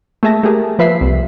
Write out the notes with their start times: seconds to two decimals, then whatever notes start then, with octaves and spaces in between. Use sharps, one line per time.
0.23 A3 A#3 G#4 E5 A5 A#6
0.43 A3 A#3 G4 G#4 A#4
0.79 F3 B4 E5 B6 C7
1.01 C2